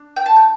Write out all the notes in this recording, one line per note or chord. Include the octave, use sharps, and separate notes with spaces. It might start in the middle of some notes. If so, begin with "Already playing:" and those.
Already playing: D4
G5
A5
G5